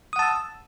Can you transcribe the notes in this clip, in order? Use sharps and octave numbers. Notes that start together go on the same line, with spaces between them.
F#5 A5 D#6 E6